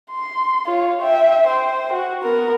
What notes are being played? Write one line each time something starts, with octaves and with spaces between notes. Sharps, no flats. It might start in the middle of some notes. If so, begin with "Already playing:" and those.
C6
F4 C#5
E5 G5
C5 G5
F#4
B3 A#4